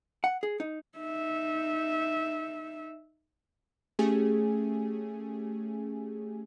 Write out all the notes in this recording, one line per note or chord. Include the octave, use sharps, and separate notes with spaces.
F#5
G#4
D#4
D#4 E5
A3 C#4 G4 G#4 G#5